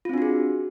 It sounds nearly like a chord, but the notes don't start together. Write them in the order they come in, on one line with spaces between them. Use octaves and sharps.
F4 C4 D4 F#4 G#4